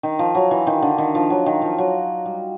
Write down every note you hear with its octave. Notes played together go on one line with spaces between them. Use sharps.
D#3
F3
F#3
E3
D#3
D3
D#3
F3
F#3
D#3
F3
F#3
G3